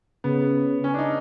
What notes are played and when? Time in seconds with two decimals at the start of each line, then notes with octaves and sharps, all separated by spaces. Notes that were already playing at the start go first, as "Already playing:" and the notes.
0.24 C#3 B3
0.84 C#4
0.94 D4
0.98 D#4